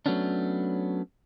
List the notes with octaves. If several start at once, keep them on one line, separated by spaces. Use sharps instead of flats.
F#3 A3 B3 C#4 D4